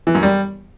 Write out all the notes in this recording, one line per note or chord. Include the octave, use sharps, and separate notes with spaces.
E3
F#2
G3